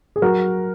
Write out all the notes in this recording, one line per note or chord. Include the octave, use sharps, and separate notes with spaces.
G#4
F#3 F#4 A#4